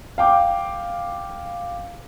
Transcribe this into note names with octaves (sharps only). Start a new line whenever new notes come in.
F5 G5 D6